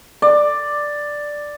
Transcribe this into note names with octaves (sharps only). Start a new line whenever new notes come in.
D5